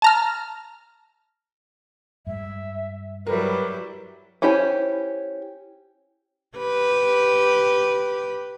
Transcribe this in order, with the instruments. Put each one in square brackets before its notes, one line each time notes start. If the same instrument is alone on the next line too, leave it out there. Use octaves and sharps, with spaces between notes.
[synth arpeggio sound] A5 A#5 F6
[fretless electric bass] G2 G#3 [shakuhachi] E5
[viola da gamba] F#3 G3 E4 [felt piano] A#4 [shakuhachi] B4
[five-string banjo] C#4 E4 G4 C5 G#5
[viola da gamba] G4 B4